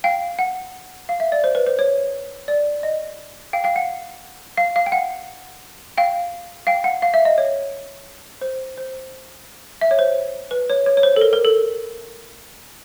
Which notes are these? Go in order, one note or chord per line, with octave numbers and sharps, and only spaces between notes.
F5 G5
F#5
F5
E5
D5
C5
B4
C5
C#5
D5
D#5
F5 G5
F5 G5
F#5
F5
F5
G5
F#5
F5 G5
F5 G5
F#5
F5
E5
D#5
C#5
C5
C5
E5
C#5
C5
B4
C#5
C#5
C#5
C5
A4
A#4
A#4
A4